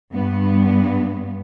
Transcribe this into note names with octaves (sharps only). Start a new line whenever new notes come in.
G2 B3